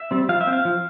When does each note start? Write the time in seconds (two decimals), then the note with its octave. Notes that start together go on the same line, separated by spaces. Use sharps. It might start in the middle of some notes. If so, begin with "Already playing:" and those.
Already playing: E5
0.11 G3 C4
0.29 F3 F5
0.41 E5
0.47 C4
0.53 F5
0.65 F3